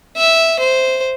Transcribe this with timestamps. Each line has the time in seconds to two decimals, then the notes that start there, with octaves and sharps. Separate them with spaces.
0.17 E5
0.59 C5